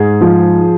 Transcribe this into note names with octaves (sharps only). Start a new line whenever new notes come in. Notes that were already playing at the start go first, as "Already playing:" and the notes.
Already playing: G#2 G#4
F3